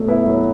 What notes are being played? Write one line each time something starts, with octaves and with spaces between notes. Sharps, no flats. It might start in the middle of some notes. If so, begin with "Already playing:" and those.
Already playing: B2 F#3 A3 A4
E4 B4
F#3